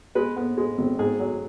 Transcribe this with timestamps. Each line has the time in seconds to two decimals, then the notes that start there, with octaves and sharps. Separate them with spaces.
0.15 G#3 B4
0.36 B3
0.57 G#3
0.78 G#1
0.99 G#2 G#4
1.20 F#3